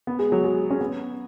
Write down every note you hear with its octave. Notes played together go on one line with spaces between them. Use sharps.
B3
G#3
F#3
G#3
C#4
B3